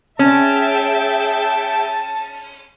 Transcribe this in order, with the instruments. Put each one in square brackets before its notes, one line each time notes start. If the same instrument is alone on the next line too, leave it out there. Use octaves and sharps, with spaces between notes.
[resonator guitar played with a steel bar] C#4 [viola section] G#4 E5 G5 [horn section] A5